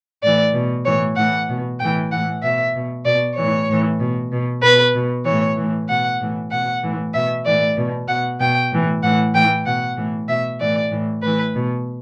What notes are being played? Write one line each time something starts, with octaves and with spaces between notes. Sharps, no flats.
A2 E3 D5
B2
A2 E3 C#5
A2 E3 F#5
B2
A2 E3 G5
A2 E3 F#5
B2 E5
B2
B2 D5
A2 E3 C#5
A2 E3
B2
B2
B2 B4
B2
A2 E3 C#5
A2 E3
B2 F#5
A2 E3
B2 F#5
A2 E3
B2 E5
A2 E3 D5
B2
B2 F#5
B2 G5
A2 E3
A2 E3 F#5
A2 E3 G5
B2 F#5
A2 E3
B2 E5
A2 E3 D5
A2 E3
A2 E3 B4
B2